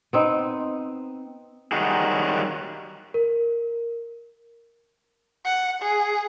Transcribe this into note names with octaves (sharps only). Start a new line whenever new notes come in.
B3 C4 D#4
D#3 F#3 G3 D#4 F#4 G#4
A#4
F#5
G#4